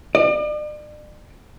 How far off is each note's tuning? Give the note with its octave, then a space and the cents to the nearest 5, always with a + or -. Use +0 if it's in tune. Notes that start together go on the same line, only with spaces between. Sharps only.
D5 +40